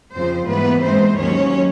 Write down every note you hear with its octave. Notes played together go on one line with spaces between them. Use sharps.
F2 C#3 F3 C4 C5
G#2 E3 G3 A#3 B3 B4
G#2 E3 G#3 C4 C5
D#2 D#3 F#3 C#4 C#5